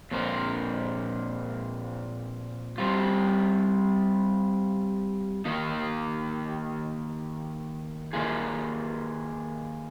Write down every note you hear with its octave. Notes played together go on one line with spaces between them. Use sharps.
A#2 F3 C4 F4 A#4
G3 C4 F4
D#3 A#3 D#4
D#3 A#3 F4 G#4